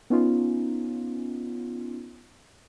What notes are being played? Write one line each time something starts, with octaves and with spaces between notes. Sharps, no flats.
B3 C#4 D#4 F4